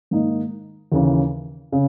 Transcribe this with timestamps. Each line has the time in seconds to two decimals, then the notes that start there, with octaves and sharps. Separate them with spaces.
0.11 G#2 D#3 A#3 D#4
0.92 D#2 C#3 E3
1.72 C#3